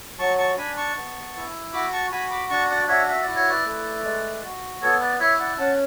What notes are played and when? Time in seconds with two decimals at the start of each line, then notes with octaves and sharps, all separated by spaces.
0.19 F#3 A5 C#6
0.38 A5 C#6
0.57 D4 G#5 B5
0.77 A5 C#6
0.95 B3
1.35 E4
1.73 F#4 B5 D6
1.93 A5 C#6
2.11 F#4 G#5 B5
2.31 B5 D6
2.50 D4 A5 C#6
2.69 D5 F#5
2.88 F#4 C#5 E5
3.08 E5
3.22 D5
3.27 E4
3.35 C#5
3.49 B4 D5
3.65 A3
4.04 G#3
4.43 F#4
4.82 B3 A4 C#5
5.00 B4 D5
5.20 E4 C#5 E5
5.39 D5 F#5
5.58 C#4 F#5 A5